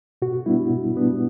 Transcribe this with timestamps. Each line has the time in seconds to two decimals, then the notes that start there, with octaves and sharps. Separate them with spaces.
0.22 B2 F#4
0.46 G3 B3 D4 E4
0.71 B2
0.96 G3 B3 D4